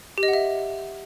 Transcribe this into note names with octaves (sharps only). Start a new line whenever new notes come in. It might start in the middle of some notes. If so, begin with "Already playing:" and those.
G4
D#5
F#5
E5